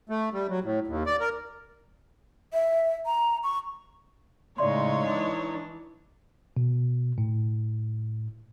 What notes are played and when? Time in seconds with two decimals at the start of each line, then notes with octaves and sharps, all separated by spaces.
0.10 A3
0.33 G3
0.49 F#3
0.63 A2
0.87 D#2
1.06 D5
1.20 A#4
2.53 E5
3.06 A#5
3.44 C#6
4.58 A2 C#3 G#3 D#4 C#5 D5 E5 C6
5.06 E3 D4
6.57 B2
7.18 A2